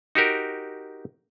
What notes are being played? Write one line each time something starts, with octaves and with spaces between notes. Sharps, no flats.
D#4 F#4 G4 A#4